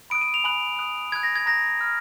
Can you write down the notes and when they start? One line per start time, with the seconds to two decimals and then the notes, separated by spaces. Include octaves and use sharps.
0.10 B5 D#6 F#6 D7
0.21 D#7
0.34 F7
0.44 G#5 B5 D#6 F#6 F#7
0.79 B5 D#6 F#6
1.12 B5 D#6 F#6 G#6
1.23 A#6
1.36 G#6
1.46 A#5 D#6 F#6 A#6
1.81 B5 F6